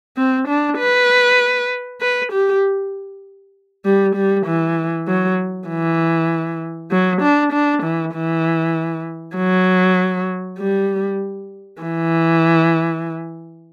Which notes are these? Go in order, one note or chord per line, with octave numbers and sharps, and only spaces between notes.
C4
D4
B4
B4
G4
G3
G3
E3
F#3
E3
F#3
D4
D4
E3
E3
F#3
G3
E3